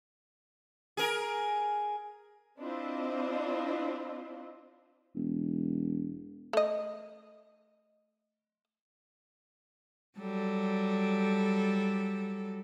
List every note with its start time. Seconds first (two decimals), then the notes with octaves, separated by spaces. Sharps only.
0.97 G#4 A#4
2.60 C4 D4 E4 F4 C5 D#5
5.15 E1
6.53 A3 D#5
10.19 F#3 G3 A4